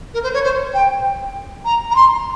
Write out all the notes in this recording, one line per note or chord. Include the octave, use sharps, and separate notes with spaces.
A#4
C5
C#5
C5
G5
A#5
A#5
C6